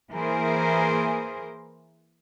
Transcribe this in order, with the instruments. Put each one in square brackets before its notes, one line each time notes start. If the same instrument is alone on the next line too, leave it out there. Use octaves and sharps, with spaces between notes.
[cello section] E3 A#3 G#4 A#4 C5